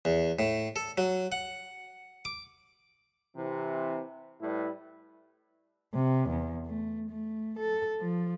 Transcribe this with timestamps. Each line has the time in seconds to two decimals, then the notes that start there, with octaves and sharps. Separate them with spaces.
0.05 E2
0.39 A2
0.76 A4
0.98 F#3
1.32 F#5
2.25 D6
3.36 C3 E3
4.41 A2 G3 E4 B4
5.94 C3
6.30 E2
6.66 A3
7.11 A3
7.60 A4
8.01 F3